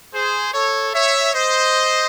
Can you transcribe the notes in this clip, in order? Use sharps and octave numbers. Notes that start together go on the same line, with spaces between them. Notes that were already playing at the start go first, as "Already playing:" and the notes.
G#4 C5
A4 C#5
C#5 E5
C5 D#5